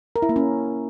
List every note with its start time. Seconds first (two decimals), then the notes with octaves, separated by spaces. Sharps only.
0.16 A#4
0.22 E4
0.29 A#3
0.36 C#4